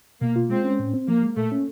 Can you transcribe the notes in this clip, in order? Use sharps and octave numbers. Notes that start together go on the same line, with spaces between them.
B2 A#3
F4
G#3 C4
C#4
A2
C4
F3 A#3
G#3
A#2 A3
C#4